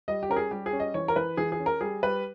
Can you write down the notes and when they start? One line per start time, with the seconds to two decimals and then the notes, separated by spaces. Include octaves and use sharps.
0.08 G3 D#5
0.23 G4
0.29 C#4 A#4
0.36 G#4
0.51 G3 G4
0.66 G#4
0.73 C#4
0.80 D#5
0.94 E3 C#5
1.08 A#4
1.16 E3 B4
1.37 E3 G#4
1.52 G#4
1.59 C#4
1.66 A#4
1.81 G3 G#4
2.03 G3 B4